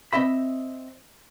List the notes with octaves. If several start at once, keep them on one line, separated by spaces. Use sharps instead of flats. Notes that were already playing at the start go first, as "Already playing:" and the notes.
C4 D#5 E5 B5